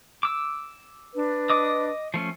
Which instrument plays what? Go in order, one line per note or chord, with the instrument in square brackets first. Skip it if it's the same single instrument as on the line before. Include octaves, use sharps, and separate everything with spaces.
[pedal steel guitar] D6 E6
[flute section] D4 B4
[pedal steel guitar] D#5 D6 D#6
F3 A3 C#4